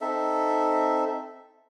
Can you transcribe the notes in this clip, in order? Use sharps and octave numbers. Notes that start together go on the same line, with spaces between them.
C4 D#4 A4 E5